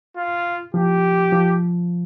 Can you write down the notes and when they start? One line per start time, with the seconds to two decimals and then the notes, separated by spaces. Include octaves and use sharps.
0.17 F4
0.74 F3 G4
1.32 F3